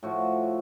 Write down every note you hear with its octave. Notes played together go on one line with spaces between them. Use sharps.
A2 F3 F#4